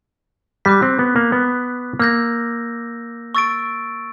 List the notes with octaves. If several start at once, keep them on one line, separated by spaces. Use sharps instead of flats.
G3 D6 F#6 B6
C4
B3
A#3
B3
A#3 E6 G6 A#6
C#6 E6 A6 D7